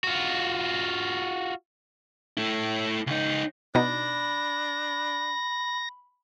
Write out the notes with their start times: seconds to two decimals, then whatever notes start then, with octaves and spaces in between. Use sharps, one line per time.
0.04 F4 F#4
2.37 A3 E4
3.07 C#2 D#4
3.75 B2 D4 D#4 B5 A#6